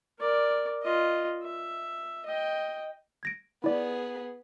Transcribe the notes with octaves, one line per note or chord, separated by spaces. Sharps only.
A#4 D5
F4 D#5
E5
D#5 G5
G#6 A#6 D7
B3 E4 G#4 D5